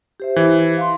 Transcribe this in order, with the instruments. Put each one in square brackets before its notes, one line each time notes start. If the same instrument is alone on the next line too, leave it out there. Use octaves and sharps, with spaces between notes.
[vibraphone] G4 C5 E5
[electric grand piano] E3
[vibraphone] F5 C6